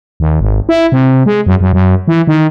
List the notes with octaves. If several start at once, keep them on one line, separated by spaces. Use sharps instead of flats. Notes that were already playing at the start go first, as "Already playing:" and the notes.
D#2
G#1
E4
C3
G#3
F#2
F#2
F#2
E3
D#3